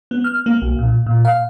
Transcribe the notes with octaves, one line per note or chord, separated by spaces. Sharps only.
B3
F6
A#3
B1
A#2
A#2
F5